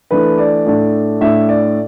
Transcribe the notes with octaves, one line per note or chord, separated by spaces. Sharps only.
E3 A3 D4 B4
D5
A2 A3 D4
A2 A3 D4 E5
D5